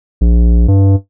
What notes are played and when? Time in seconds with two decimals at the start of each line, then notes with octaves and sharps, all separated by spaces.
0.21 A#1
0.68 G2